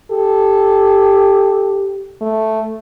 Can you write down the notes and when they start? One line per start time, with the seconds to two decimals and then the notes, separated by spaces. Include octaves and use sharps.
0.11 G4 A4
2.22 A3